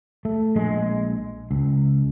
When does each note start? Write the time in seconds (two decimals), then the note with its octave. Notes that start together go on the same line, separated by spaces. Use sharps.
0.25 A3
0.56 A#1 G#3
1.51 C#2